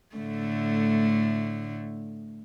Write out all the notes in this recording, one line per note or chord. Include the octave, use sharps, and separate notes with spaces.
A2 D3 A3